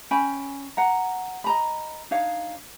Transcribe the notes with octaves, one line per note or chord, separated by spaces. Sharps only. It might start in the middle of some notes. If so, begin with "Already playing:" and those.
C#4 G5 G#5 B5
F#5 A#5
D#5 A#5 B5
D4 D#4 C#5 F5